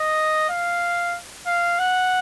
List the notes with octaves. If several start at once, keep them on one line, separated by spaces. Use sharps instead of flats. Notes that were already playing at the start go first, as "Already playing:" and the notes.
Already playing: D#5
F5
F5
F#5